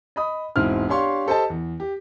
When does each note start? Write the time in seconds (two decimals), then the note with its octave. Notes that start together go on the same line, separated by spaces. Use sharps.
0.16 D#5 B5 D#6
0.56 E1 G#2 C4 E4 F6
0.88 D4 G4 C#5 F5 C6 C#6
1.27 G4 A4 C5 D#5 A5
1.50 E2
1.80 G4